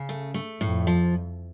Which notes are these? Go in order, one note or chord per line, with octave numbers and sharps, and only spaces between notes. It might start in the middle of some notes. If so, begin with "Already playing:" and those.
Already playing: C#3
A3
A3
F2 A2
F3